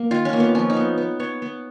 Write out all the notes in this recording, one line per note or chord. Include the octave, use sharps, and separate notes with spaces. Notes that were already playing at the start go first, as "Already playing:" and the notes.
Already playing: A#3
D#3 F4
C#4
A#3
B3
F3 C#4
D#4
B3
B3
B3 C#5
B3